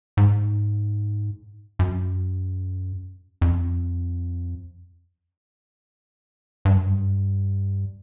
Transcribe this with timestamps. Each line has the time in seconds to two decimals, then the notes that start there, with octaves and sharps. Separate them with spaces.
0.17 G#2
1.79 F#2
3.42 F2
6.65 G2
6.76 F#2
6.87 G2